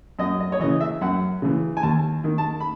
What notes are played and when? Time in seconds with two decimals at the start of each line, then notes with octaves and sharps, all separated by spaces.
0.19 F#2 D#5
0.40 D#5
0.52 C#5
0.60 C#3 E3 D#5
0.80 E5
1.01 F#2 F#5
1.42 C#3 E3
1.77 G#5
1.83 D#2 A5
2.24 D#3
2.38 A5
2.60 B5